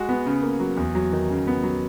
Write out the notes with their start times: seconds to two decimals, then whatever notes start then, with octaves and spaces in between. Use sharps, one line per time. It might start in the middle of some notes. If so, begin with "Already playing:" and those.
Already playing: G#3 F#4
0.09 B3
0.26 C#3
0.42 A#3
0.60 F#3
0.77 E2
0.95 F#3
1.13 D#3
1.30 C#3
1.47 B3
1.63 F#3